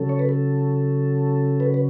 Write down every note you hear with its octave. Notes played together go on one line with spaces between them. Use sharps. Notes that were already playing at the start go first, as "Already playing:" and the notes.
Already playing: C#3 F#3 C#4 A4
C#5
B4
A4
B4
B4